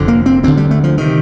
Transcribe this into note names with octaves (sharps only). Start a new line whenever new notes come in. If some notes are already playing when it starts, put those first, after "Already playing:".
Already playing: F1 F2 D3
A#3
C4
D2 D3 C4
G3
A3
F3
C3 D#3